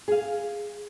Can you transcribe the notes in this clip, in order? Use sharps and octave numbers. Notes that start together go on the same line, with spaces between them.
G#4 F5